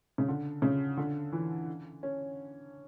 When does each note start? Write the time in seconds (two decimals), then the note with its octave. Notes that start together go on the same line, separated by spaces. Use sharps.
0.18 C#3
0.28 D3
0.62 C#3
0.97 D3
1.32 E3
2.03 C#4